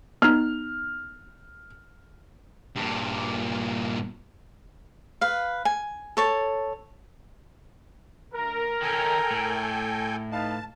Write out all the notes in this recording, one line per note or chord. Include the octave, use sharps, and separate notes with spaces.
B3 D#4 F6
G2 A#2
B4 F5
G#5
A4 C#5 A5
D2 A#4
D#3 C#4 A4 G5 G#5
A2
D#4 B4 F5 A5